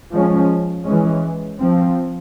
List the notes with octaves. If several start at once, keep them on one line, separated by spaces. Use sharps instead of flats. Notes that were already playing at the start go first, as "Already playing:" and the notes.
F3 G#3 C#4
E3 G#3 C#4
F3 C4